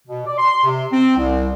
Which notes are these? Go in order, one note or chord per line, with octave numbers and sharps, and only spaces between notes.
B2
D5
C6
C3
C4
C2